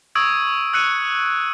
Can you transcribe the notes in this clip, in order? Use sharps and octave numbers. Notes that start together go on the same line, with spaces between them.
C#6 D#6 E6 G#6 D7 D#7
E6 F#6 C#7 D#7